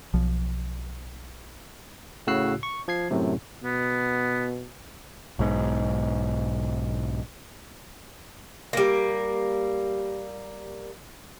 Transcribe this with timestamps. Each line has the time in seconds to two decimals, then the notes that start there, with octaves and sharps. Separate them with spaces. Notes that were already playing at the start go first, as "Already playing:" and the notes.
0.14 B1 F3
2.27 A2 C#3 F#4 E6 F#6 C7
2.63 C#6
2.88 F3 G#6 C7
3.11 F#2 A2 C3
3.64 B2 B3
5.39 B1 G#2
8.73 G3 A#3